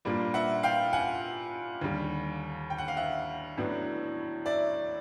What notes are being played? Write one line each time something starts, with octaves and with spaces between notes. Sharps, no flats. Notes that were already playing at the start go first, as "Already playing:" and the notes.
A#2 G3 A#3 D4
E5 F#5
F5 G5
F#5 G#5
D#2 D3 G3
G5
F#5
F5
E5 F#5
A2 F#3 B3 D4
D5 E5